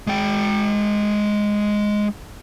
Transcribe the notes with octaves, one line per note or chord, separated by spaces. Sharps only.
G#3 G5